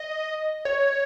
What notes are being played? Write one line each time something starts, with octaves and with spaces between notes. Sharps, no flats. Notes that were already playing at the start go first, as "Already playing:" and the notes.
Already playing: D#5
C#5